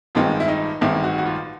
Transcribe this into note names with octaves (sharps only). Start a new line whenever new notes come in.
A1 G2 D#3 G#3 C4 F4
E4
D#4
A1 G2 D#3 G#3 C4 E4
F#4
F#4
F4